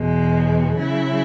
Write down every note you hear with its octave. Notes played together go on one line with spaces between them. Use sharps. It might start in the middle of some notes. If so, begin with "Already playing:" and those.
Already playing: E2 B2 G#3
C#3 F#3 E4